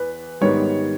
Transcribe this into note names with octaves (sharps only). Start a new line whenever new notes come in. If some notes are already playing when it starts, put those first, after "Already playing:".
Already playing: E2 B4
G#2 D#3 G3 B3 C#5